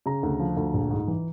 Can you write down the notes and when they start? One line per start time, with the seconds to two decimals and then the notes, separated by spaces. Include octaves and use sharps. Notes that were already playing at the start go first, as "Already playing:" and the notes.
0.06 C#3 A#5
0.23 D2
0.39 F3
0.57 D2
0.74 A#1
0.91 G#2
1.08 E3